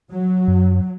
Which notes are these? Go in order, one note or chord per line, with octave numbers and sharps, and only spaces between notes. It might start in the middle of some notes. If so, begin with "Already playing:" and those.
F#3
F#2